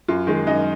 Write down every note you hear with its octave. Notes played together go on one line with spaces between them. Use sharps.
F#2 F4
D#3 G#3
F#2 D#4